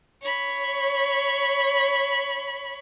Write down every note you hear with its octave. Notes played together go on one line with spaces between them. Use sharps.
C#5 B5